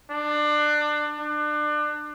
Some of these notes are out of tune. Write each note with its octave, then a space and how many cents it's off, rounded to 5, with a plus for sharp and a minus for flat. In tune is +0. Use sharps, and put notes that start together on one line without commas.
D4 +25
D4 +30